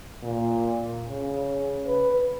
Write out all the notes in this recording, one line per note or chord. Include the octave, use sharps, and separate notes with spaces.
A#2
C#3
B4